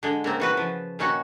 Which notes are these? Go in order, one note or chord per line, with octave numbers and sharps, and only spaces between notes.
D3 G#3
C#3 A#3 C4
E3 F#4 B4
F3
A#2 D#3 C#4 F#4 F#5